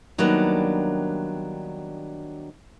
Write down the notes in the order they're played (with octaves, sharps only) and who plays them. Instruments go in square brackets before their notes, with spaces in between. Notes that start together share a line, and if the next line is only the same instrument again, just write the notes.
[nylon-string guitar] D#3 F#3 G3 A#3 B3 D4